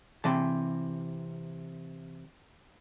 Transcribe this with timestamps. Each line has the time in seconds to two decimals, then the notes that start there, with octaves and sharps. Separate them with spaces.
0.24 C3 E3 A5